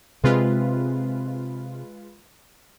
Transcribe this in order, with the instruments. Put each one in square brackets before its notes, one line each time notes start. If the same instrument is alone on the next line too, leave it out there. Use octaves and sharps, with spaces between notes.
[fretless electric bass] C3 C4 [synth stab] G#3 F4 B4